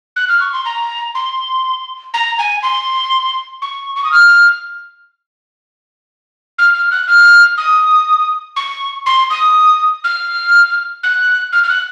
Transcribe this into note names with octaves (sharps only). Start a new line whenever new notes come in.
F#6
F6
C#6
C6
A#5
C6
A#5
G#5
C6
C#6
C#6
D#6
F6
F6
F6
F#6
F6
D#6
C#6
C6
D#6
F6
F#6
F6
F6
F#6